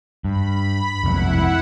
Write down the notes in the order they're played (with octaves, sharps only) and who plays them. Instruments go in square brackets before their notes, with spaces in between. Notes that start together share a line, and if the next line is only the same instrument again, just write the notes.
[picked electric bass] G2 [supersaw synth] B5
[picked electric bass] F1 B1 F2 [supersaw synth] E4 F#5